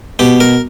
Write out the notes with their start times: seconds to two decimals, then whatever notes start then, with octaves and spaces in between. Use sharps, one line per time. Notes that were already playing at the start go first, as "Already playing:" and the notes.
0.19 B2 G4
0.40 A#4